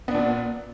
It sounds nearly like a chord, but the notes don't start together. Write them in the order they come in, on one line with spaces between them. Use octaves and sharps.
B3 D4 A#2